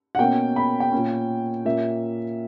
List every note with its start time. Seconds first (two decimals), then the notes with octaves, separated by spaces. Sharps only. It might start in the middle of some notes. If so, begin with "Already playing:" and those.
0.15 F#5
0.19 B2 A#3 C#4 G5
0.56 B5
0.80 G5
0.92 A#2 A#3 C#4
1.65 A#2 A#3 C#4 E5